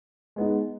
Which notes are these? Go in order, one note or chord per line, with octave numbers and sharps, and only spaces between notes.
G#3 B3 D#4